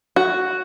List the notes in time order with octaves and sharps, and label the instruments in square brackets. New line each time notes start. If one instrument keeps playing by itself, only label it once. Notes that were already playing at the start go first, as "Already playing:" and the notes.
[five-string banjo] F#4